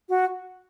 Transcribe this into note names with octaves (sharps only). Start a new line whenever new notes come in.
F#4